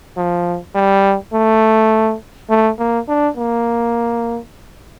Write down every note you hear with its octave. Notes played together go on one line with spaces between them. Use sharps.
F3
G3
A3
A3
A#3
D4
A#3